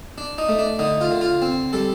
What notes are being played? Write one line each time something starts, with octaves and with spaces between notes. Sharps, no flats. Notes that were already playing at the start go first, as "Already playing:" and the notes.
D4
D#4
A3
D4
D3 D#4
F4
D3
F4
C4
G3 A4